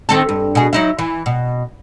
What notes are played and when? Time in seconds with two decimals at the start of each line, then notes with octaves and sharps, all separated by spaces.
0.09 D#3 C4 A4
0.29 G2
0.55 B2 G#4
0.73 F#3 D#4 E4
0.99 E3
1.26 B2